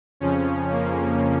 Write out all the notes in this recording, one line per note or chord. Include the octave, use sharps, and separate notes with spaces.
F2 C#3 F3 C#4
A#3